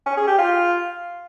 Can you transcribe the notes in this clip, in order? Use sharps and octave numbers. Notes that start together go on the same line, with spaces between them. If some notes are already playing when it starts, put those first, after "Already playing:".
C#4
G#4
G4
F4